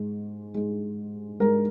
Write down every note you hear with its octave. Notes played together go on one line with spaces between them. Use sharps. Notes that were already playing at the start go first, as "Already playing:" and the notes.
Already playing: G#2 G#3
G#2 G#3
G#2 G#3 A#4